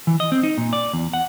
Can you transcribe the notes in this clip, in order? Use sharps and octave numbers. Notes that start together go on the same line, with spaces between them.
E3
D#5
C4
D#4
A#2
D5
E2
F#5